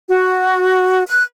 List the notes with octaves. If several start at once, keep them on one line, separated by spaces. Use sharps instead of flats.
F#4
F#6